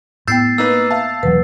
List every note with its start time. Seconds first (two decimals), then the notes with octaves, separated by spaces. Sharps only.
0.28 A2 A3 B3 G5 E6 G6 A6 C7
0.58 A#3 D#4 B4 E6
0.91 E5 F5 A5
1.23 E1 E3 F#3 A#3 B4